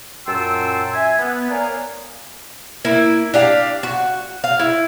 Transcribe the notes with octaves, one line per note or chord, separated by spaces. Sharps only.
F#2 A#2 G5 A5 C6 E6
E5 G#5
B3
A#4 C#5 D5 F5 G#5
A#3 E4
D4 G4 F5
F#4
F5
E4